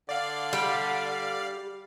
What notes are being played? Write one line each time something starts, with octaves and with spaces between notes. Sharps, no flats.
D3 D5 F5
G3